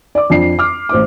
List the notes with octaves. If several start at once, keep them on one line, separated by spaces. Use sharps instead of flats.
D5 D6
F2 D4 C7
D6 F6
A1 C5 D6